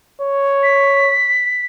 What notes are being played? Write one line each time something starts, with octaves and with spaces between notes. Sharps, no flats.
C#5
B6